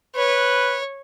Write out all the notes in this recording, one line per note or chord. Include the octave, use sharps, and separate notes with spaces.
B4 C#5